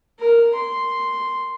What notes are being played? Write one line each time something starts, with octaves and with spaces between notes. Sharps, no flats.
A#4
C6